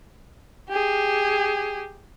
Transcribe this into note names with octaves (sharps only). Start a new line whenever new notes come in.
G4 G#4